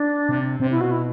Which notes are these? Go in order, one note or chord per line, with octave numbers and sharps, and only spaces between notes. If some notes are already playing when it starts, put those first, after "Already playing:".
Already playing: D4
C3
C3 C4
E4
B2
F#4
E4